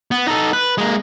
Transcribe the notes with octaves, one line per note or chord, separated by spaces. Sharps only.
B3
D#4 A4
B4
G#3 A#3